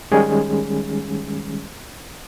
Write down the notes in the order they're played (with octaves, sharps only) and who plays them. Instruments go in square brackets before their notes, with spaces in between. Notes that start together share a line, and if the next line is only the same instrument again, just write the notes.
[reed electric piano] D#3 G3 G#3 C#4 G#4